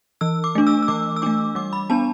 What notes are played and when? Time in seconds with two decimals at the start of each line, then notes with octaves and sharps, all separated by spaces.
0.21 E3 E6
0.44 D6
0.55 A3 D4
0.67 E6
0.82 E6
0.88 E3 D6
1.16 E6
1.22 A3 D4 D6
1.55 G3 D6
1.73 B5
1.90 B3 D4 A5